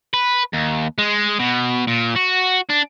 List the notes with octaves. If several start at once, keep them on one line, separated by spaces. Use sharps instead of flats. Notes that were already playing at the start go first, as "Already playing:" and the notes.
B4
D#2
G#3
B2
A#2
F#4
D4